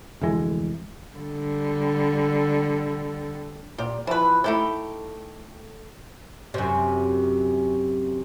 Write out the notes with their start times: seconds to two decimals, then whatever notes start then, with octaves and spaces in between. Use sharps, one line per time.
0.21 F1 D2 E3 G#3
1.17 D3 G3
3.78 A#2 G4
4.07 E3 F3 B4
4.44 A3 D#4 E4 G4 G5
6.54 F#2 C3